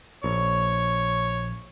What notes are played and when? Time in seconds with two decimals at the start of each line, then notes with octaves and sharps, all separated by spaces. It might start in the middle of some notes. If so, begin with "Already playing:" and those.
0.24 A#1 C#5